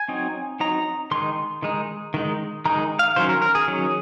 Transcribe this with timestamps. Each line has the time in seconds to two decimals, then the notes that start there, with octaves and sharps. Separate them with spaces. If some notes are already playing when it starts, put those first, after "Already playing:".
Already playing: G#5
0.08 F#3 C4 D#4
0.60 F#3 C4 D#4 A#5
1.11 D#3 G#3 D#4 C6
1.62 D#3 G#3 D#4
2.14 D#3 G#3 D#4
2.65 D#3 G#3 D#4 A#5
2.99 F5
3.16 D#3 F#3 C#4 C5
3.29 A#4
3.42 A#4
3.55 G#4
3.68 D#3 F#3 C#4